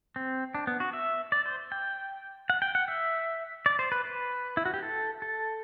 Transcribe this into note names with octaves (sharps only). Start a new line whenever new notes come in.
C4
D4
B3
F#4
E5
D5
C5
G5
F#5
G5
F#5
E5
D5
C5
B4
B4
E4
F#4
G4
A4
A4